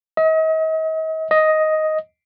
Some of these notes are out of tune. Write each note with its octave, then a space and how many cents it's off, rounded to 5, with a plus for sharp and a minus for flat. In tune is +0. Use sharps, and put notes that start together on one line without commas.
D#5 +40
D#5 +5